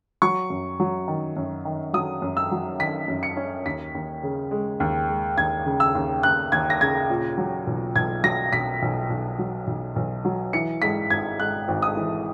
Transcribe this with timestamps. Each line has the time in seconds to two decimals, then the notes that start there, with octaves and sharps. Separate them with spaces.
0.22 F#3 C#6
0.50 F#2
0.80 F#3
1.08 D#3
1.37 F#2
1.65 D#3
1.93 F#3 D#6
2.22 F#2
2.37 E6
2.51 F#3
2.79 D#3 B6
3.08 F#2
3.23 C#7
3.37 C#4
3.65 D#2 B6
3.95 D#2
4.23 C#3
4.51 G#3
4.80 D#2
5.09 G#3
5.37 D#2 G#6
5.66 C#3
5.80 E6
5.95 D#2
6.23 D#2 F#6
6.52 D#2 G#6
6.70 A#6
6.81 C#3 G#6
7.10 A#2
7.38 F#3
7.67 B1
7.96 B1 G#6
8.24 F#3 A#6
8.53 B1 B6
8.82 B1
9.10 B1
9.38 F#3
9.67 B1
9.96 B1
10.25 F#3
10.53 E3 C#7
10.82 G#2 B6
11.10 G#1 G#6
11.39 G#2 F#6
11.68 G#1
11.82 D#6
11.96 E3